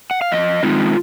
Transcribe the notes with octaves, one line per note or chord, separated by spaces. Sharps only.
F#5
F5
F2 D#5
D#3 G#3 C4 D#4 F4